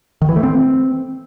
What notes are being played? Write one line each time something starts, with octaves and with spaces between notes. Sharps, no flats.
D#3
E3
A3
C4